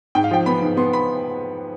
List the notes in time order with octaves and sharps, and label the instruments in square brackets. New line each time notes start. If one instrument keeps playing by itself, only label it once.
[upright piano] G#2 G5
F5
F3 G5
B3 B5
G#2
B3 C6
B5